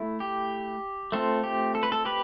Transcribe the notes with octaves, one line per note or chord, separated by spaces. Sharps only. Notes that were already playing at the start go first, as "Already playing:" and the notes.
Already playing: A3 E4
G4
A3 C4 F4 A4
G4
A4
B4
A4
G4 B4